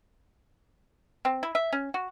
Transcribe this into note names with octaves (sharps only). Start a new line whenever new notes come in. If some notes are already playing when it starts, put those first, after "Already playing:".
C4
E4
E5
C#4
F#4